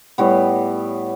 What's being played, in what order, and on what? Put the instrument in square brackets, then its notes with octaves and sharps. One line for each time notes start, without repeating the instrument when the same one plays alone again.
[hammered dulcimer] A2 G3 B3